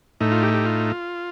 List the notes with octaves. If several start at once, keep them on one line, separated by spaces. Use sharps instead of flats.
A2 A3 D#4
F4
G4
G4
F4